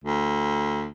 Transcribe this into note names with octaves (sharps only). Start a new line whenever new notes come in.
D2